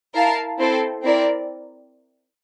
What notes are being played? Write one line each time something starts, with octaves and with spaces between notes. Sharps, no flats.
E4 A#4 F5 A5
C4 E4 A4 C5
C4 E4 A#4 D5